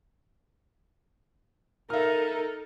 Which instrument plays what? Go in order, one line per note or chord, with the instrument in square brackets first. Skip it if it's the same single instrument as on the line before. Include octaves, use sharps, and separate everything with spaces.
[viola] D#4 A4 [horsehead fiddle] A#4 [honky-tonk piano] E5 F6